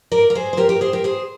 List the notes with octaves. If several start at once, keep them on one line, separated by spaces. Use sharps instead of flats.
A#4 D5
A#4
G#4 C5
C5
G4 A#4
G4 A#4
G#4 C5
G4 A#4
G#4 C5